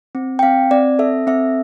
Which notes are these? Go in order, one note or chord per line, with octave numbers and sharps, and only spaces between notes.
C4
G5
C4 F5
C4 D5
A4 E5
C4 E5